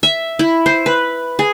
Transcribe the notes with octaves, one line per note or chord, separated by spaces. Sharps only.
E5
E4
C5
B4
G#4